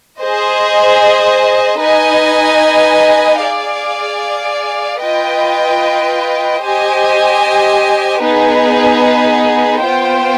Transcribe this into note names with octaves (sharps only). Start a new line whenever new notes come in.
G#4 C5 D#5
D#4 B4 D#5 G#5
G#4 D5 F5
F4 B4 D#5 G5
G4 C5 D#5 G#5
B3 D#4 G#4 B4
B3 F4 C5 G5